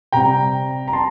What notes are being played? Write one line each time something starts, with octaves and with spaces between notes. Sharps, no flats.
C3 G3 C4 G5 A#5
A#5
A5 C6